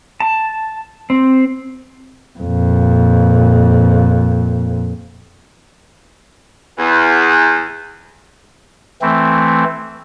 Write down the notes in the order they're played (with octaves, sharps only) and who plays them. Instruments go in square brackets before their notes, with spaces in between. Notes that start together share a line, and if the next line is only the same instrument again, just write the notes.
[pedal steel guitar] A5
C4
[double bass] F2 A#2
[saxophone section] E2
[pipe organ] E3 A3 C4